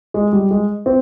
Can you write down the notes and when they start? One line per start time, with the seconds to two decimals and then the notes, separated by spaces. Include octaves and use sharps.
0.14 G#3
0.33 G3
0.51 G#3
0.86 C4